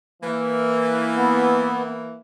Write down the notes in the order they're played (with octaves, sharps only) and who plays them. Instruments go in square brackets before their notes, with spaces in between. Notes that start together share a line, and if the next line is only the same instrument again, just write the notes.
[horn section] E3 A#3
[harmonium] B3